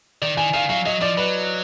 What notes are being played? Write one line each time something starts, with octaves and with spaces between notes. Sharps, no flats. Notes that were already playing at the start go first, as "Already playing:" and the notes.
D#3 D5
D#3 G#5
D#3 F5
F#3 F5
F#3 D#5
F3 D5
F#3 B4